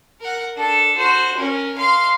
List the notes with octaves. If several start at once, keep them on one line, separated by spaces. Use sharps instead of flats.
A#4 F#5
D4 A4
F#4 C5
C#4 A#4
F5 C6